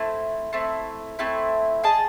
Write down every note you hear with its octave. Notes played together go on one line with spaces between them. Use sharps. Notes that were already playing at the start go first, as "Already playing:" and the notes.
Already playing: A3 C4 E4
A3 C4 E4
A3 C4 E4
G#4 D#5 A5